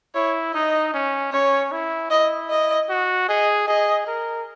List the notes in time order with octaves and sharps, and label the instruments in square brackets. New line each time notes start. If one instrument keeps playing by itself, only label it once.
[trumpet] E4 [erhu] C#5
[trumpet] D#4 [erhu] D#5
[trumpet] C#4
[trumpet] C#4 [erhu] C#5
[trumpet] E4
[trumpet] E4 [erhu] D#5
[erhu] D#5
[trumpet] F#4
[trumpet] G#4 [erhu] D#5
[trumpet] G#4 [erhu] D#5
[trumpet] A#4